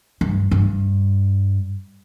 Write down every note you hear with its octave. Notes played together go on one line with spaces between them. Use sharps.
G2
G2